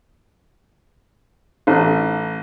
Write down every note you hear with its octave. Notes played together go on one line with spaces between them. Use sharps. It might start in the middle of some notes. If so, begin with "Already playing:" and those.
A1